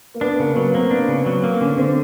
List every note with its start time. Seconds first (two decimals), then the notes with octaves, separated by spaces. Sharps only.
0.14 A#3
0.21 B3 D4
0.39 C#3 A#3
0.56 F#3 B3
0.74 A#3 C4
0.91 B3 D4
1.08 C#3
1.26 F#3
1.44 A#3
1.61 D3 C#4
1.78 D3 C4